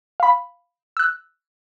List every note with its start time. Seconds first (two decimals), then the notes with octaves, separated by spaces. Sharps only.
0.20 F5 B5
0.97 E6 F#6